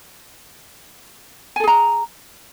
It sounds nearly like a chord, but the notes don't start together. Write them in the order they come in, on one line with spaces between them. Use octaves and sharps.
G#5 A4 G#4 A#5